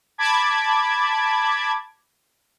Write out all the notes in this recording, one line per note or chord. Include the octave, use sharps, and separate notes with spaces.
A5 B5 D6 G#6